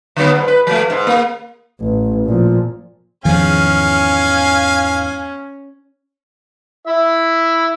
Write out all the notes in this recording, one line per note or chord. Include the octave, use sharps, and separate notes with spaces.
D3 F#3 B3
G#2
B4
F3 A3
G#2
A#3
A1
A#2 F3
E2 G#2 D#3 F3 C#4 F5 G#5
E4 E5